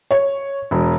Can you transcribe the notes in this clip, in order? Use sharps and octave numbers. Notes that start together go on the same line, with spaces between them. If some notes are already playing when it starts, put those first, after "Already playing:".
C#5
E1